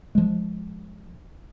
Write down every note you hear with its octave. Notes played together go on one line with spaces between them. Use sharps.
F3 G#3